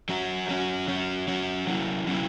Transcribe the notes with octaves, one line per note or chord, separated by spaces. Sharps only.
F#3 C#4 F#4
F#3 C#4 F#4
F#3 C#4 F#4
F#3 C#4 F#4
F#3 C#4 E4
F#3 C#4 E4